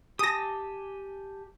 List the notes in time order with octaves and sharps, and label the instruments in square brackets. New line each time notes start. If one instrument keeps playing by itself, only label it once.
[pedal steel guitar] G4 G#5 A5 [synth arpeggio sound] D#6 A#6